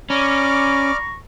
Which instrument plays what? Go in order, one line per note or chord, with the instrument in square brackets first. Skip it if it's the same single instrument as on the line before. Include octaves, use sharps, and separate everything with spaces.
[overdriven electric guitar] C#4 [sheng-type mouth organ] D5 D6 F6 [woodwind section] A#5 B5 C#6